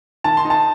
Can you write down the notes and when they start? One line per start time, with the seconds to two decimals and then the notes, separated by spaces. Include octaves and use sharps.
0.24 D#3 A5
0.37 C6
0.45 D#4
0.50 A5